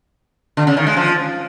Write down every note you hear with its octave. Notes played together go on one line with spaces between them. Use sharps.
D3
C#3
D#3
G#3
F3